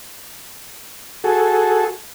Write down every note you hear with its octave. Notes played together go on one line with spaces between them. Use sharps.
F#4 G#4 A4